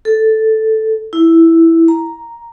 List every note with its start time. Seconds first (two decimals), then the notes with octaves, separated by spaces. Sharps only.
0.05 A4
1.13 E4
1.88 A#5